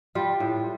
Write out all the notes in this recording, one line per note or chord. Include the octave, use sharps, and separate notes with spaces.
G3 F4
A2